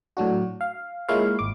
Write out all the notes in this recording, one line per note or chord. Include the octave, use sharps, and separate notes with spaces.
A2 F#3 D4 F#4
F5
G#3 A#3 E4 F4 C#5 F5
G#1 D6